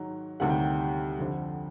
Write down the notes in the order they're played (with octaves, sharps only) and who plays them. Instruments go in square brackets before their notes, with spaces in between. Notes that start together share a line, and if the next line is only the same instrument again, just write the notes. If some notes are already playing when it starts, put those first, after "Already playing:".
Already playing: [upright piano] G#2 D#3 F#3
D2 C3 D#3 G3 F#5
G5
G5
G5
F2 D3 F3